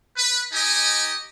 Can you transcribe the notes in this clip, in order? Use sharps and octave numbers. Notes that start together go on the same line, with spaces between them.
B4
D#4 G4 D#5 G#5